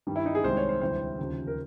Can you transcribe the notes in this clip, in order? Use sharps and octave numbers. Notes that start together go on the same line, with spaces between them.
G2 D#3 G3
E4
D#4
G#4
C2 C3 D#3 G#3 C5
C#5
C5
D2 C3 E3 G3 C5
D#2 C#3 F3
A#4